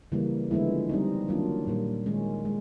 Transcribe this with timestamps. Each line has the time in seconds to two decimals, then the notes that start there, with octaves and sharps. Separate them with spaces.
0.12 C#3 E3 G3 A#3
0.51 D3 F3 G#3 B3 E4
0.89 G3 C4 D#4
1.28 D#3 F#3 A#3 D4 F4
1.67 A#2 G3 A#3
2.06 D#3 G#3 C#4
2.45 G#3